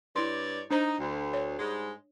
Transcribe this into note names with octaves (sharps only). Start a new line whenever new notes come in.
G2 E4 C#5 D5 C6
D4 D#4 C5 A#5
D2
C#5
G#2 G3 G#3